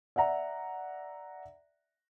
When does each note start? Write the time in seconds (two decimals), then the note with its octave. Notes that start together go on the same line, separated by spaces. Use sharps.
0.16 D5 E5 F#5 A#5